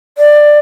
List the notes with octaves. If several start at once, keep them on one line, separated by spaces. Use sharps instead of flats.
D5